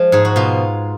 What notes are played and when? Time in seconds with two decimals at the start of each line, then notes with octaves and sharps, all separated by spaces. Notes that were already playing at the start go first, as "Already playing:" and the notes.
Already playing: F3 G#3
0.12 G#2 G#4
0.25 F#4
0.36 B2 F4